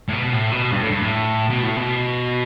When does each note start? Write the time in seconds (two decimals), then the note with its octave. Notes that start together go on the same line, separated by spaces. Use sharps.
0.08 A2
0.13 B2
0.33 A2
0.52 B2
0.72 G2
0.81 A2
0.91 G2
1.01 A2
1.50 B2
1.63 A2
1.76 B2